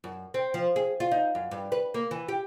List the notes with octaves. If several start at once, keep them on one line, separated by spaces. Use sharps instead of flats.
F#2
C4
F3
G#4
F4
D#4
F#2
G2
B4
A#3
E3
G4